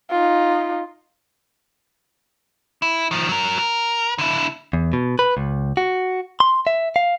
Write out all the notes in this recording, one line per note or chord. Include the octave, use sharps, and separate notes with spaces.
D#4 F4
E4
D#3 F3
F#3 A#4
A#4
D3 E4
E2
B2
B4
C#2
F#4
C6
E5
F5